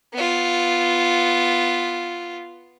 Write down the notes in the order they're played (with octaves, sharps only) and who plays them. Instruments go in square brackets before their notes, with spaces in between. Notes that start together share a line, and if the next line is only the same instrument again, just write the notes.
[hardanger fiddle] B3 F4